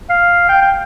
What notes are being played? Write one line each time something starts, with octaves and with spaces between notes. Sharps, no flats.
F5
G5
G5